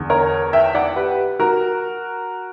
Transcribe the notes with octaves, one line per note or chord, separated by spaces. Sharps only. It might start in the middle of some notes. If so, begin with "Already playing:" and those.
Already playing: E2 D3
A#4 C#5
E5 G5
D5 F#5
G4 B4
F#4 A#4